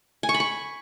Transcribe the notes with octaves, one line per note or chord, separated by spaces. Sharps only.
G#5
C#6
B5
C#6